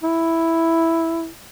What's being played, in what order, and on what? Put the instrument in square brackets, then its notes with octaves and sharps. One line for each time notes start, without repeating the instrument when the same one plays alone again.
[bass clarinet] E4